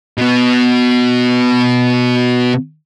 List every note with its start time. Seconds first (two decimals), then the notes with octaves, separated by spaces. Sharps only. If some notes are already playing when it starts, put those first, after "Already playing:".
0.18 B2 B3